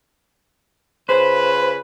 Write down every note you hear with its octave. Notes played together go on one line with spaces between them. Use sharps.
C#3 F4 B4 C5